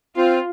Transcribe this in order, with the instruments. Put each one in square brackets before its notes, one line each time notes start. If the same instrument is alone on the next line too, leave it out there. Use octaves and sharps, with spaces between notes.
[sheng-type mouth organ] C4 [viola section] F4